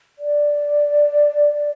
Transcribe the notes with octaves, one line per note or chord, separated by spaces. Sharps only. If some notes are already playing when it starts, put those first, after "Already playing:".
D5